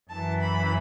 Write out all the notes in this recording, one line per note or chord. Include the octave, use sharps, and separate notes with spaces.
F#2 E3 A5
B5